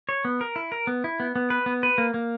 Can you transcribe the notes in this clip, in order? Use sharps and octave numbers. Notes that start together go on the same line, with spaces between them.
C#5
B3
A#4
E4
A#4
B3
E4
B3
B3
B4
B3
B4
A#3
A#3